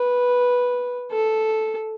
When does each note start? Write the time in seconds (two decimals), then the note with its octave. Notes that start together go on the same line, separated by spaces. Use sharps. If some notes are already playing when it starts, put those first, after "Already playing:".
Already playing: B4
1.12 A4